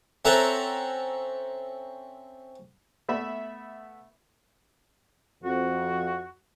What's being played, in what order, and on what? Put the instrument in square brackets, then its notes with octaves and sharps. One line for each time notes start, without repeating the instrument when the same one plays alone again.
[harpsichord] C4 C#4 A4 E5 F#5 A#5
[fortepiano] A3 B3 E5 B5
[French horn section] F2 [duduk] F#4